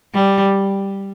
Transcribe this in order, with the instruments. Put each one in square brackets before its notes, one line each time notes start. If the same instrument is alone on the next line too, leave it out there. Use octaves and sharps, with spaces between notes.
[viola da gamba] G3